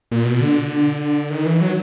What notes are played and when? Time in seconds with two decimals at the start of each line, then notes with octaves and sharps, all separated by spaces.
0.11 A#2
0.25 B2
0.40 D3
1.30 D#3
1.46 E3
1.61 F#3